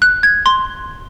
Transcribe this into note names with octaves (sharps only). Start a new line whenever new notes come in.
F#6
G#6
C6